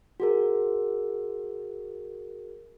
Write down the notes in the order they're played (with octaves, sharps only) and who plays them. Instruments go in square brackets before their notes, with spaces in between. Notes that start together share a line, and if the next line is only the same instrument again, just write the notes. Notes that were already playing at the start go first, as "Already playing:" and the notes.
[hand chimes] F#4 G#4 A#4